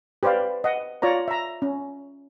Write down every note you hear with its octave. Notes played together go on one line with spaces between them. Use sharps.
G4 B4 C5 D5 F5
D#5 F#5
F4 C#5 D5 A#5
E5 A#5
C#4